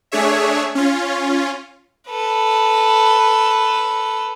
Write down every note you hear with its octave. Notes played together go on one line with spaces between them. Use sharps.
A3 D4 G#4 C#5 E5
C#4 F4
A4 B4